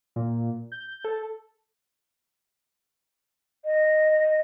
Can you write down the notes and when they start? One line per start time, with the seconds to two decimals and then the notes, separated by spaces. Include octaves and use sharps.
0.16 A#2
0.72 G6
1.05 A4
3.65 D#5